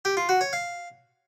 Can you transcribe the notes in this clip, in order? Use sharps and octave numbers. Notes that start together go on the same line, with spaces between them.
G4
F4
F#4
C#5
F5